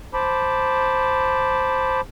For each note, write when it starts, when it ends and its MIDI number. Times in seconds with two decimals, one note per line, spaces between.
0.14 2.01 72
0.14 2.01 81
0.14 2.01 83
0.14 2.01 86